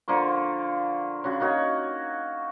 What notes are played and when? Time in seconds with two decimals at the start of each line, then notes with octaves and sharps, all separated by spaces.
0.08 D3 F3 A#3 C#6
1.24 C#3 F#4
1.40 A#3 D#4 F#4 C#5